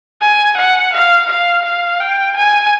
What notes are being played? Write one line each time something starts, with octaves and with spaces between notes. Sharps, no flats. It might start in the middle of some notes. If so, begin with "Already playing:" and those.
G#5
F#5
F5
F5
F5
G5
G#5